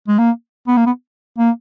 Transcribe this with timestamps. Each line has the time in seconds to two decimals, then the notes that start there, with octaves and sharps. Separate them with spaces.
0.08 G#3
0.18 A#3
0.67 B3
0.77 A#3
0.86 B3
1.38 A#3